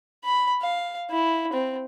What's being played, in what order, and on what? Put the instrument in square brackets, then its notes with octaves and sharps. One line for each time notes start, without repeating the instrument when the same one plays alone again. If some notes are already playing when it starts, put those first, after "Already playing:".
[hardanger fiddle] B5
F5
E4
C4